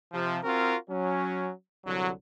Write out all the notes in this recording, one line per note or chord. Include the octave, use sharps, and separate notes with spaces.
C3 F3
C4 F4 F#4 A#4
F#3 C#4
C2 D3 F#3